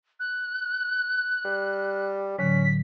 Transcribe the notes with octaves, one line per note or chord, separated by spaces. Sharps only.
F#6
G3
A2 D3 F#3 C#4 B6